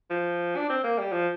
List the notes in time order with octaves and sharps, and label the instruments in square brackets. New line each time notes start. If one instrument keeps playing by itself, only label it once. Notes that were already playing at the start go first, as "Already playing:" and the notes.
[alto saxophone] F3
D4
C4
A#3
G3
F3